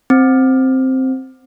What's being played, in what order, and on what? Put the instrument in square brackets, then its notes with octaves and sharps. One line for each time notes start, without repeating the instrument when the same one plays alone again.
[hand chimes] C4